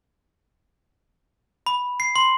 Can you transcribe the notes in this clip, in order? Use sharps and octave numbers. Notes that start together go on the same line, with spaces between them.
B5
C7
C6